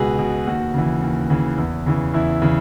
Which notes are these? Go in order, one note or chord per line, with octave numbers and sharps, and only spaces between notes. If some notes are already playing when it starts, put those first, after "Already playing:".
Already playing: C#2 B2 G#4 B4
B2
D#2 F#4
C#3 E3
D#2
C#3 E3
E2
C#3 E3
E2 E4
C#3 E3